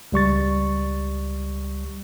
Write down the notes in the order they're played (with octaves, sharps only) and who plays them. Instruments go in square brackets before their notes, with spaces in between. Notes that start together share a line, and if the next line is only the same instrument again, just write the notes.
[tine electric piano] C#2 G3 C#6 A6